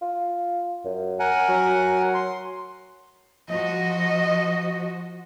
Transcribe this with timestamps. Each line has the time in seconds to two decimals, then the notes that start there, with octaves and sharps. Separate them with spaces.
0.02 F4
0.85 F#2
1.19 A#4 F#5 G#5
1.49 F#3
2.14 C6
3.49 F3 F#4 D#5